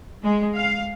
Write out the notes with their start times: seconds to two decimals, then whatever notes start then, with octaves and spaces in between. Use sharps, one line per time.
0.23 G#3
0.55 F5